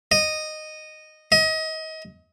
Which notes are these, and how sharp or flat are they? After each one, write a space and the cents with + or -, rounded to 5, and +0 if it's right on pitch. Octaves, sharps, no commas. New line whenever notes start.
D#5 -10
D#5 +30